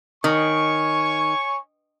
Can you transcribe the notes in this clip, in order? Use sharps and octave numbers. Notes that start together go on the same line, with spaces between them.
D#3 C#5 G#5 C#6